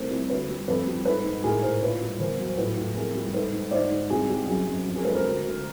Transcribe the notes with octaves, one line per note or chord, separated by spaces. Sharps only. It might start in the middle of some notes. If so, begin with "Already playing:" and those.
Already playing: C2 A3 A#4 C5
C2
D2 B4 C#5
G3
F2 A4 B4
G3
G#2 A4 B4
G#2
A2 G#4 A#4
A2 A#4 C5
A#2 B4 C#5
G3
E2 A#4 C5
F#3
C5
A2 A4 B4
A2
F2 G#4 A#4
G3
G#2 A4 B4
G#2
G#2 C5 D5
G#2
C2 G#4
C2 G4
F#2 G#4
F#2
F2
G#4 A#4
G#3 A4 B4
A#4 C5
D2
D2